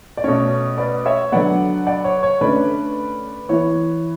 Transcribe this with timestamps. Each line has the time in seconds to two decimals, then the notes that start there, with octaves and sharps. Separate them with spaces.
0.17 D5
0.24 B2 A3 C#4 C#5
0.78 B4 D5
1.05 C#5 E5
1.32 D3 F#3 B3 D5 F#5
1.87 D5 F#5
2.05 C#5
2.23 C#5
2.41 D3 A3 C#4 B4 D5
3.49 E3 B3 C#5